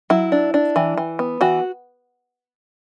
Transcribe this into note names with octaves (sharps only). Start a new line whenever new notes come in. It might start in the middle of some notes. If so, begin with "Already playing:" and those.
F#3 E4
D4
D4
E3
E3
B3
E3 F#4